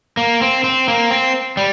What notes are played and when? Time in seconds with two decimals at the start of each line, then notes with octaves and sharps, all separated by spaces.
0.17 A#3
0.41 C4
0.64 C4
0.88 A#3
1.11 C4
1.57 G3